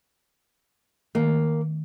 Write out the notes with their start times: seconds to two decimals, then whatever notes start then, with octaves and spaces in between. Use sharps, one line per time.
1.15 D#3 A#3